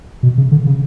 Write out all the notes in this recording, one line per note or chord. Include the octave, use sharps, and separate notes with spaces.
B2
C#3
D3
C#3